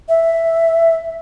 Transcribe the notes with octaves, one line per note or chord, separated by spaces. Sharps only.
E5